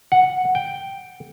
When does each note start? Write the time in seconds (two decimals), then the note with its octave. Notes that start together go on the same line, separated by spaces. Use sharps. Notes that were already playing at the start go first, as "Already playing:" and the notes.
0.12 F#5
0.55 G5